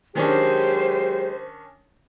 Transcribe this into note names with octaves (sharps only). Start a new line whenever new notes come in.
D#3 F#3 G#3 C#4 D4 G4 C5